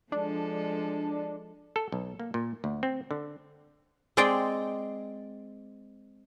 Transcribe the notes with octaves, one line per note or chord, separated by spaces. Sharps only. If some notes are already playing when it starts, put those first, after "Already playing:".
F3 G#3 D4 A4
A4
B1
A#3
A#2
D2
C4
D3
G#3 C4 D5 G5